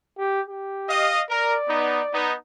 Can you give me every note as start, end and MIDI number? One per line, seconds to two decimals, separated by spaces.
0.18 0.41 67
0.48 1.18 67
0.89 1.22 75
0.89 1.22 77
1.29 1.55 70
1.29 2.28 74
1.68 2.01 59
1.68 2.01 63
2.13 2.34 59
2.13 2.34 63